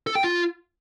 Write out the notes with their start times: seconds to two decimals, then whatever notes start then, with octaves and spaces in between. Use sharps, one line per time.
0.07 A4
0.15 G5
0.24 F4